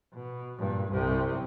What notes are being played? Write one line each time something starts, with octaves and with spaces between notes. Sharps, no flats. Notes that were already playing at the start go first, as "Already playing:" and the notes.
B2
G2 A#2
C2 C3